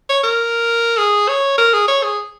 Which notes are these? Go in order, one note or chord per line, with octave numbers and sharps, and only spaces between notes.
C#5
A#4
G#4
C#5
A#4
G#4
C#5
G#4